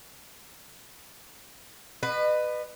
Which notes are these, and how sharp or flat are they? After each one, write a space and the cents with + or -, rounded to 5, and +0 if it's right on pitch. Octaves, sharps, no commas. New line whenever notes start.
B4 +10 D#5 -35